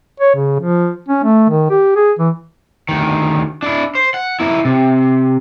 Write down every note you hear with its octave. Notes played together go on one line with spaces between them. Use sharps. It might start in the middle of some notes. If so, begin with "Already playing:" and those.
C#5
C#3
F3
C#4
A3
D#3
G4
G#4
E3
D2 D#3
D4 E4
C5
F#5
A#3 E4
C3